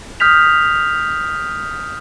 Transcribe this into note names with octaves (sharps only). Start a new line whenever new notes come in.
D#6 F6 G6 B6 F7